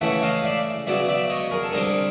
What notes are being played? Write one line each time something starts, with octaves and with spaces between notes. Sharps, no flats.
C#3 E3 A3 C#4 E5 F#5
D#5 F5
D5 E5
C#3 F#3 B3 D5 E5
D5 E5
C#5 D#5
G#4 A#4
A4
D3 G3 C4 G#4 A#4